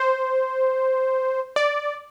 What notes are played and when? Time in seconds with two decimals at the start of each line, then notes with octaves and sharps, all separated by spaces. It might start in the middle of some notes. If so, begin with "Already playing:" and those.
Already playing: C5
1.56 D5